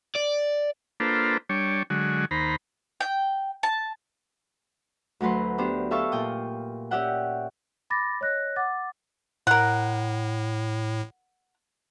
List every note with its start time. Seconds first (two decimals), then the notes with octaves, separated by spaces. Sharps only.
0.16 D5
1.00 A#3 D4 F4 A4 B4 C5
1.49 G3 D4 C#5
1.90 D3 F#3 G#3 F#4
2.31 D#2 C5 A#5 B5
3.01 G5
3.63 A5
5.21 D2 F#3 A3 B4 C6
5.58 B3 D4 G4 C5
5.91 G4 A4 E5 F5 A5 C#6
6.12 A#2 G5 D#6
6.91 C#4 G4 D5 E5 F#5 G5
7.90 B5 D6 A6 A#6
8.21 C#5 D#5 F#6 A#6
8.56 F#5 D6 A6
9.47 A2 A#4 F#5